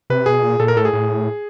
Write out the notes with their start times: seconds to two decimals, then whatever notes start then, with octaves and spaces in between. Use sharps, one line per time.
0.10 C3 B4
0.26 B2 G#4
0.43 A#2
0.60 A#2 A4
0.68 A#4
0.76 A2 A4
0.85 G#4
0.93 A2